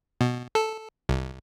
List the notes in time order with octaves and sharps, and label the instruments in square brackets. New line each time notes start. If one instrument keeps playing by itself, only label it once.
[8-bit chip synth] B2
A4
C2